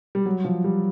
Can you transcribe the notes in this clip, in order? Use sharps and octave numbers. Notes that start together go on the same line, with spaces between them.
G3
F#3
F3
G3